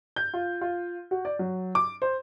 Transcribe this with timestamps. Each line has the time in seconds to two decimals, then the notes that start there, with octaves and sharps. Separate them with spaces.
0.16 G6
0.34 F4
0.61 F4
1.11 F#4
1.25 D5
1.39 F#3
1.75 D6
2.02 C5